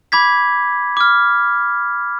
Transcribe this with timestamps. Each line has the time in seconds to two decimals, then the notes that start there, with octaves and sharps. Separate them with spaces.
0.12 B5 D6 G#6 B6
0.97 D6 F6